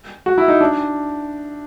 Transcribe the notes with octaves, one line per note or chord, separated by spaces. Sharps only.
F#4
E4
D#4
D4